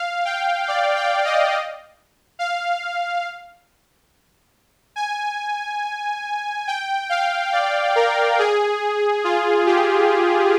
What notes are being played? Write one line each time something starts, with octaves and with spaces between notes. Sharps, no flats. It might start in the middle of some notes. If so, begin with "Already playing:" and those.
Already playing: F5
G5
D5
G5
D#5
F5
G#5
G5
F5
D5
A#4
G#4
F4
G4